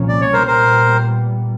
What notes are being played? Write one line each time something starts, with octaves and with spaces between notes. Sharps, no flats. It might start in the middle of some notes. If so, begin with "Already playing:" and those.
Already playing: C2 A#2 F3 A#3 C#4
D5
C#5
A#2 G3 B3 A#4 C5
A#4 C5